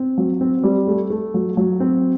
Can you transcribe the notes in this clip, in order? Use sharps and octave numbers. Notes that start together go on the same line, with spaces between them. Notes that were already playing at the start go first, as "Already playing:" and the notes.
Already playing: C4
F#3
C4
G3
A3
A3
F#3
F#3
C4